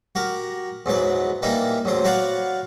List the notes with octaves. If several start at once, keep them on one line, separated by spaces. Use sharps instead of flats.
F#4 G4 A#4
E2 G#2 F#3 B4
E3 G3 A#3 D#4 E4 G4
A1 E2 F#3 C5
F#4 B4 C#5 D5 F5 F#5